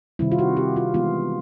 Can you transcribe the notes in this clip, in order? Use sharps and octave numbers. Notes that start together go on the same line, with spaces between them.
C3 D#3 G3 C4 E4
F4
F#4
G4
F4
E3 G#3 B3 F4